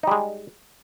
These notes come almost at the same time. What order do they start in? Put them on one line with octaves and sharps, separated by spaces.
D#4 G3 G#3